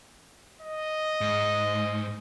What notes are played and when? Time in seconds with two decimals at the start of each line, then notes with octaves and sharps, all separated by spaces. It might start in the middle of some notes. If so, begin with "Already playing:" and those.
0.61 D#5
1.21 G#2